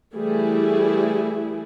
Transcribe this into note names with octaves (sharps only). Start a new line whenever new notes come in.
E3 G3 A3 E4 G#4